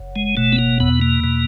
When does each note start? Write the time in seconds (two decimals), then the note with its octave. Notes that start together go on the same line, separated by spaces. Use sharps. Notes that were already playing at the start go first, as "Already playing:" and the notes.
Already playing: F#1
0.16 G#3
0.37 B2 A3
0.53 B3
0.59 A#3
0.80 E2 B3
1.01 A#3
1.24 B2